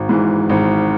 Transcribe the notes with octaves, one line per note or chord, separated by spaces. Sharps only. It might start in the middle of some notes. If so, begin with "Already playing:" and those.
Already playing: G#1
G#2 E3
G#1